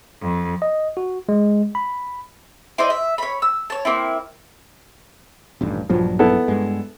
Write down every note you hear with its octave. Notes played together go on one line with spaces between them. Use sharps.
F2
D#5
F#4
G#3
B5
E4 C5 D5 D#5
E5
C#5 B5
E6
C#5 A5
A#3 C4 E4
D#1 A1 G2
A#1 G2 F3 F#3
B3 E4 A4
G2 G#3